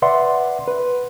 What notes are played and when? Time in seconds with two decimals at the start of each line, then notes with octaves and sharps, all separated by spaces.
0.02 B4 D5 E5 F#5 C6
0.68 B4